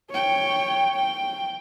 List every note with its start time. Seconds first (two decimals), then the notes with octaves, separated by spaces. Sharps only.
0.11 C#5 G5
0.95 G5